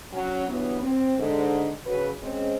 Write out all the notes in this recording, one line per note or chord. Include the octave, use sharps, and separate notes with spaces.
F#3 C#4
G2 E3 F#3 B3
C4
G#2 D3
C#3 F#3 B4
G#3 C4 C#4